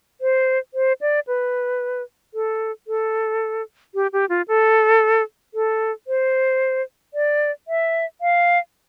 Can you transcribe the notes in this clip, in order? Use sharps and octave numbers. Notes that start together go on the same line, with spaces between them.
C5
C5
D5
B4
A4
A4
G4
G4
F4
A4
A4
C5
D5
E5
F5